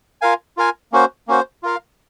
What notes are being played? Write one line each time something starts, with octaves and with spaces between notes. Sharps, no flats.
F4 A#4 F5 G#5
F4 A#4 F5 G#5
A#3 C#4 F#4 C5
A#3 C#4 F#4 C5
F4 A#4 F5